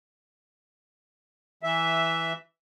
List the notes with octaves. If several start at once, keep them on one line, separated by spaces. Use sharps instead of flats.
E3 E5